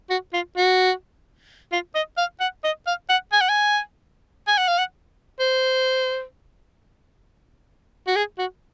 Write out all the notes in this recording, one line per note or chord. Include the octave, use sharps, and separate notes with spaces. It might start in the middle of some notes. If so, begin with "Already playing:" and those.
F#4
F4
F#4
F4
D#5
F5
F#5
D#5
F5
F#5
G#5
F#5
G#5
G#5
F#5
F5
F#5
C5
F#4
G#4
F#4